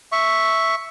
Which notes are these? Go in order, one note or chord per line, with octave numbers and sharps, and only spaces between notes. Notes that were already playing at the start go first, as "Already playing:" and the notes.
E5 C#6